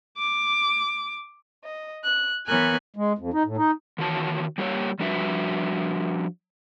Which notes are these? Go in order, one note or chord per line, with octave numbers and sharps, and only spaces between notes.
D6
D#5
F#6
E3 B3 A#4 C#5 G#5 F#6
G#3
F2
D#4
A2
D#4
D#3 E3 F#4 C#5 A5
G3 A#3 G4 B4 C#5
F3 G3 D4 F#4 B4 E5